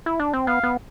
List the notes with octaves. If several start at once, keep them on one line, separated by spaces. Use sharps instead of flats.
E4
D4
C4
B3 F5
B3